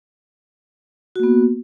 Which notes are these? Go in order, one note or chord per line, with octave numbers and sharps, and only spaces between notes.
A#3 B3 F#4